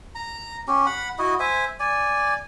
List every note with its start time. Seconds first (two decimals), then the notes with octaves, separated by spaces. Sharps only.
0.15 A#5
0.68 C#4 G4
0.86 F#5 B5
1.18 E4 F#4 D#5
1.40 C5 E5 G#5
1.80 D5 G#5